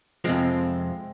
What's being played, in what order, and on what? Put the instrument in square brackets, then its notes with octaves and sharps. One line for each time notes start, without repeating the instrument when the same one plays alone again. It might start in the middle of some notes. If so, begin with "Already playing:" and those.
[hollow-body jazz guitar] F2 C3 F3 G#3 C4